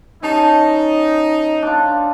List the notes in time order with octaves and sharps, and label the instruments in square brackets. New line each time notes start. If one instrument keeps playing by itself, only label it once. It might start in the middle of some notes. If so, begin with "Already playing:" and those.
[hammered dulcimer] C#4 A5 [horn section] D#4
[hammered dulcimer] D4 F4